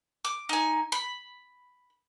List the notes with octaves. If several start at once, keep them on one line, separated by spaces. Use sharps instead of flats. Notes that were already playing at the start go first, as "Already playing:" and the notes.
D6
D#4 G#5
B5